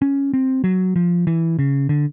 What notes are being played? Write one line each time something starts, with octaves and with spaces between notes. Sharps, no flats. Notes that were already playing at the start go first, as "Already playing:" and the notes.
C#4
C4
F#3
F3
E3
C#3
D3